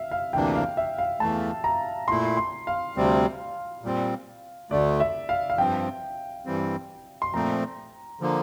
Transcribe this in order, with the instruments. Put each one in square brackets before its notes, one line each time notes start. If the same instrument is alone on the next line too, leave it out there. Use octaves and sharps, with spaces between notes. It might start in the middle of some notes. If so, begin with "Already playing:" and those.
Already playing: [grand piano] E5 F5
F5
[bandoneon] D2 C3 E3 A#3 D4 [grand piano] G5
[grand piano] F5
E5
F5
[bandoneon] E2 E3 A3 [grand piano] A5
[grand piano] A#5
[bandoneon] A#2 A3 E4 [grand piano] C6
[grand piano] C6
F5
[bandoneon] D2 C3 G3 C4
A#2 G3 C4
[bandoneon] D2 D3 A3 [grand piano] D5
[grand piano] E5
F5
F5
[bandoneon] G2 F3 C4 [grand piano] G5
[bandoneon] G2 E3 G3 C4
[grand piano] C6
[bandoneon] A#2 F3 A3 C4 [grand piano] A#5
[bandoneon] D3 F3 A#3